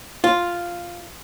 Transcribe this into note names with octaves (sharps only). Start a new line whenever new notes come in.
F4